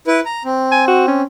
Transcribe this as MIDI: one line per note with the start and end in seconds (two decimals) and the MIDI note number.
0.07 0.20 64
0.07 0.20 71
0.26 0.43 82
0.45 1.22 60
0.72 0.83 80
0.88 1.06 66
1.08 1.24 61